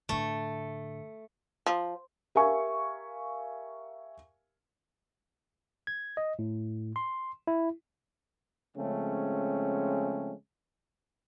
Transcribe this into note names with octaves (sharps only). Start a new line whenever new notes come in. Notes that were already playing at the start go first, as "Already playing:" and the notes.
A2 D3 A3
F3
G4 A#4 E5 F5 G#5 C#6
G#6
D#5
A2
C6
E4
C#3 F3 G#3 A3 C4 C#4